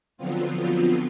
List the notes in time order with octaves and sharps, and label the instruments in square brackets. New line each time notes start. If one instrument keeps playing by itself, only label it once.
[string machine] D3 F3 F#3 B3 C4 F4